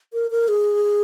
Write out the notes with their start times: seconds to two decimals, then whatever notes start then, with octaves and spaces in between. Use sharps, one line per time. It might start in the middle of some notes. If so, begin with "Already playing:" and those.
0.13 A#4
0.31 A#4
0.48 G#4